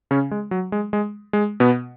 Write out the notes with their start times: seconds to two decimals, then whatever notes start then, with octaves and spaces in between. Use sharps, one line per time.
0.11 C#3 C#4
0.31 G#3
0.51 F#3
0.72 G#3
0.93 G#3
1.33 G#3
1.60 B2 B3